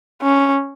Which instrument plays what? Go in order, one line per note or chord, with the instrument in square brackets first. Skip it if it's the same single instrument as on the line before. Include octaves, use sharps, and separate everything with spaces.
[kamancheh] C#4